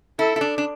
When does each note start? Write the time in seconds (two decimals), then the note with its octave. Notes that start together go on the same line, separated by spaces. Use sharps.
0.19 E4 A4
0.36 E4
0.41 D4
0.58 D4